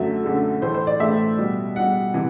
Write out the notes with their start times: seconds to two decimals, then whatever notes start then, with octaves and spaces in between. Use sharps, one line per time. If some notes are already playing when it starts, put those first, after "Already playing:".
Already playing: F#2 D3 F#3 A3 E5
0.24 F#2 D3 F#3 A3
0.61 A2 E3 A3 C5
0.74 C5
0.87 D5
1.00 A2 E3 A3 E5
1.37 B2 G3
1.76 B2 G3 F#5
2.14 C3 E3